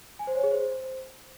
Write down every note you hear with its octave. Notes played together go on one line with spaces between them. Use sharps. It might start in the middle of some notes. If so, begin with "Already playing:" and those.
G#5
C5
C#5
G#4
C5